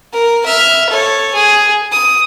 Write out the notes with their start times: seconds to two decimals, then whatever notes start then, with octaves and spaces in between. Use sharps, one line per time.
0.13 A#4
0.46 E5 F6
0.90 A4 C#5
1.35 G#4
1.92 D#6